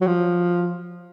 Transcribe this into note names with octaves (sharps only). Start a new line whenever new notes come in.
F#3
F3